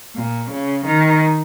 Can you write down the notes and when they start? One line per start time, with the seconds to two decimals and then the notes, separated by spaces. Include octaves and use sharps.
0.16 A#2
0.51 C#3
0.86 D#3